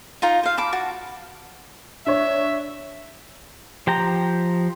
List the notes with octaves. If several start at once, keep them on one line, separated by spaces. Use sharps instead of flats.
D#4 F4 A#5
C5 F5
A5 B5 D6
F#4 A5
D4 C#5 E5
F3 G4 G5 A#5